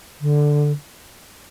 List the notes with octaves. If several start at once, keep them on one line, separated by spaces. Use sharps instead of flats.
D3